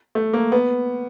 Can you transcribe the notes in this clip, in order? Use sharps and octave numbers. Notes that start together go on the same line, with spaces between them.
A3
A#3
B3